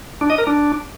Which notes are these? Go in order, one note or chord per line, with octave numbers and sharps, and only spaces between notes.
D4
D#5
A#4
D4